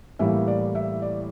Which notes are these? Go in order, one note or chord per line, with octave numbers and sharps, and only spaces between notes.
A2 E3 G3 A#3 E5
D5
E5
D5